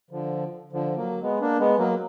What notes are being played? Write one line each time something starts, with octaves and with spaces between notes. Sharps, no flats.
D3 F3
D3 F3
F#3 A#3
G#3 B3
A#3 D4
G#3 B3
F#3 A#3